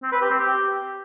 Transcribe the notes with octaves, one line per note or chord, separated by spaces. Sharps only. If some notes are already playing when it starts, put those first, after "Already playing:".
C4
B4
G4
C4
G4